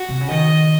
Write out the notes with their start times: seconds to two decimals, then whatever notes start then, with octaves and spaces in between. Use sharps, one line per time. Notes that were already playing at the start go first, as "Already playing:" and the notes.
Already playing: F#4
0.09 C3
0.21 C#3
0.31 D#3 D#5